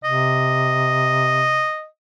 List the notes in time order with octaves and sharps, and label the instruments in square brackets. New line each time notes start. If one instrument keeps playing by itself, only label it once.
[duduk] C3 [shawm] D#5